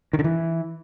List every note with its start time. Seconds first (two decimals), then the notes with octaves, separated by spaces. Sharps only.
0.13 D#3
0.19 D3
0.24 E3